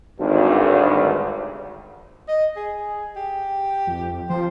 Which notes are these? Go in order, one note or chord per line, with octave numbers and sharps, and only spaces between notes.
G#1 D2 G2
D#5
G#4
G4
F2
F3 C5